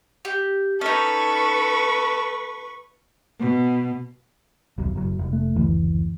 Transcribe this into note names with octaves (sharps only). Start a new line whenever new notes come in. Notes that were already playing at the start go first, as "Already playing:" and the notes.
G4
C#4 D#4 A4 B4 C#6
B2
D#1 B1 F#3
F#1 F#3
F1
A3
F#1 D2 E3